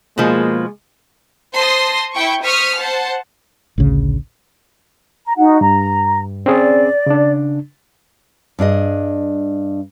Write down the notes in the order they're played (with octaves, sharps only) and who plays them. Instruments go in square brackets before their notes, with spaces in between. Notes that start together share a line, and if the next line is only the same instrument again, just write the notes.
[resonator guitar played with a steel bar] B2 F3 [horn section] G#3 [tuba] A#3
[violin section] C5 A5 C6 D#6 A#6
E4 G5 C#6
C5 C#6 D#6 F6 B6
C5 F#5 A5
[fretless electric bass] A1 D2 C#3
[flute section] A#5
D#4 F#4 F#5
[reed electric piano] G2 [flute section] A#5
[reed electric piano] C4 C#4 G#4 [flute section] D5
[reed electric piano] C#3 D4
[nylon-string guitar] G2 D4 G#4 D#5